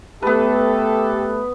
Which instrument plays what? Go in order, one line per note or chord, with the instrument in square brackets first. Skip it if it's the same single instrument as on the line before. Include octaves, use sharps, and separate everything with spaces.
[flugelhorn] A3 [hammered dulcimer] B3 B4 [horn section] G4 A4